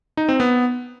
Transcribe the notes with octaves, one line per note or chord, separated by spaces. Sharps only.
D#4
C4
B3